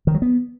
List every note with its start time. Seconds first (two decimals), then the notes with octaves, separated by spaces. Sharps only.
0.07 D#3
0.14 F#3
0.22 B3